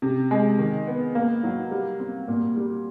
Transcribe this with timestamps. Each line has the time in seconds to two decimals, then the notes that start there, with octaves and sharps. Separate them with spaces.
0.02 C3
0.31 G#3
0.59 D#3
0.87 B3
1.15 A#3
1.43 F#3
1.71 G3
2.00 C4
2.28 A#2
2.57 G3